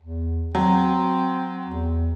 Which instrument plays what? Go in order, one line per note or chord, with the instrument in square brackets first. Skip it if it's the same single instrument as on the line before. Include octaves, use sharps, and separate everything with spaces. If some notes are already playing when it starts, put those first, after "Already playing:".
[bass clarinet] E2
[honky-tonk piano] F#3 [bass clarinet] C4
[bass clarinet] E2